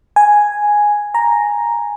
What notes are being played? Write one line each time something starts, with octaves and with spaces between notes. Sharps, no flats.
G#5
A#5